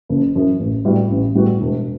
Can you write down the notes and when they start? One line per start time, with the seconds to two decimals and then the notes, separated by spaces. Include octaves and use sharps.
0.09 F#1
0.36 F#2 E3
0.60 A1
0.85 A2 G3 B3 F#4
1.10 A1
1.35 A2 G3 B3 F#4
1.61 E1